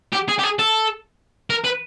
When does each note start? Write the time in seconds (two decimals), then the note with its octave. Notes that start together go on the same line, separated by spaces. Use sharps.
0.13 G4
0.29 G#4
0.39 G4
0.44 G#4
0.59 A4
1.50 A#4
1.65 B4